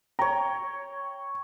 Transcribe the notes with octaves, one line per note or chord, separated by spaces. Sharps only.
C#5 G5 A#5